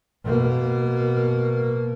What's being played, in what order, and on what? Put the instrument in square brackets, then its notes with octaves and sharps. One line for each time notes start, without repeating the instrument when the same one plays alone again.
[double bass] B2 A#3